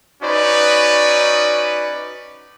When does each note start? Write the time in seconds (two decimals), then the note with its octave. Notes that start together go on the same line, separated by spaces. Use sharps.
0.22 C#4 D#4 F#4 B4 D5